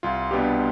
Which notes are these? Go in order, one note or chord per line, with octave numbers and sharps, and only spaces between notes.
C2 F4
B2 G3 B3 D4 G4